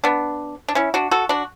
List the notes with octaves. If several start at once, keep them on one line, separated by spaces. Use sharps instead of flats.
B3 D4
D4
C#4 E4
D4 F#4
F#4 A4
D4 F#4